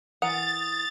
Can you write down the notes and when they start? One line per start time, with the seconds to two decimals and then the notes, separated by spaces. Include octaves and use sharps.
0.22 E3 A#4 F#5 D#6 A6